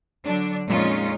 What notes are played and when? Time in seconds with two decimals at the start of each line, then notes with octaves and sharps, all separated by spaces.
0.24 D3 F#3 D4
0.67 F2 A#2 G#3 C#4 D#4 F4